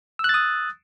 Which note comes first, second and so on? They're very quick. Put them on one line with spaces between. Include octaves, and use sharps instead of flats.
E6 F#6 A6 D#6